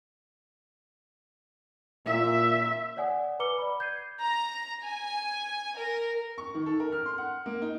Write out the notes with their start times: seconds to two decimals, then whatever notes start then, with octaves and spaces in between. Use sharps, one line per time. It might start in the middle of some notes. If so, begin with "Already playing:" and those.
2.06 A#2 E5
2.97 C#5 D5 F#5 G#5 D#6
3.40 B4 A#5 D6 F6 C#7 G7
3.58 D5 B5
3.80 G6 G#6 C7 D#7
4.22 A#5
4.84 G#5
5.77 A#4
6.38 C#6
6.55 D#3
6.66 A4
6.80 A#4
6.92 F6
7.06 C6
7.18 F#5
7.46 A#3
7.62 D#4